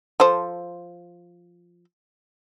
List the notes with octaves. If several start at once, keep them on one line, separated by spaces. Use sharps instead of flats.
F3 A4 C5